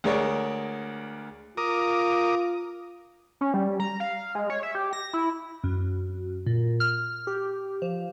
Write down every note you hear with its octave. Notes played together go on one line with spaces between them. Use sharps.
D2 G#3 A#4 C#5 D5 C#6
F4 A#4 D6 D#6
C#4
G3
A#5
F5
G#3
C#5
E5
G4
A#6
E4
F#2
A#2
F6
G4
F3